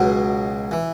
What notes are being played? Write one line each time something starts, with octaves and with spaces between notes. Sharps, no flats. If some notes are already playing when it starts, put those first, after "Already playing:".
Already playing: C#2 B2 F#3
E3